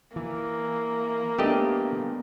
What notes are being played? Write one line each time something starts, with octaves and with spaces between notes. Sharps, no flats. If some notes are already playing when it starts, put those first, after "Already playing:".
E3 A#3
A3 B3 D4 G4 D#5